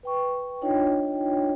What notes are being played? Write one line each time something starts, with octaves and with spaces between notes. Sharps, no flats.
B4 G5 C#6
D4 D#4 F4 C#5 D#5 G5